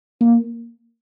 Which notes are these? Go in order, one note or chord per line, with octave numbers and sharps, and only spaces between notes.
A#3